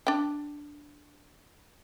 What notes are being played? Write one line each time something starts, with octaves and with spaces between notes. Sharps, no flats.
D4 G5